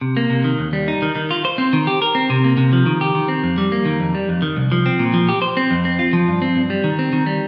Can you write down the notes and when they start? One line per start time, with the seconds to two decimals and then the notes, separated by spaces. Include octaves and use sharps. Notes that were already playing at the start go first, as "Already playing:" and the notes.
0.01 C3
0.17 A#3
0.30 C3
0.44 D#3
0.59 D#2
0.73 G3
0.88 D#4
1.02 D#3
1.15 D#3
1.31 F4
1.45 C5
1.58 C4
1.73 D#3
1.87 G4
2.02 A#4
2.15 C4
2.30 C3
2.44 A#3
2.57 C3
2.73 F3
2.86 D#3
3.01 G4
3.15 D#3
3.28 C4
3.43 F2
3.58 G3
3.72 A#3
3.85 D#3
4.00 F2
4.15 G3
4.29 F2
4.42 D#3
4.57 C2
4.72 F3
4.86 C4
4.99 A#2
5.14 F3
5.29 G4
5.42 C5
5.57 C4
5.71 F2
5.85 C4
5.99 F4
6.13 F3
6.28 G2
6.42 C4
6.55 G2
6.70 G3
6.84 D#3
6.99 C4
7.13 D#3
7.26 G3